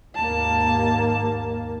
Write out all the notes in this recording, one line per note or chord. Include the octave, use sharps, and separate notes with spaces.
D#2 G#2 A#3 A5